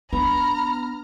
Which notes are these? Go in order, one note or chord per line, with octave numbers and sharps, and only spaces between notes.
B3 D4 A#5 B5 F6